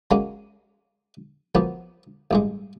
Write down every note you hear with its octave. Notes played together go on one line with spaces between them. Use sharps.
F#3 G#3 A#3 C#4
F3 F#3 A#3 B3
A1 G2 G#3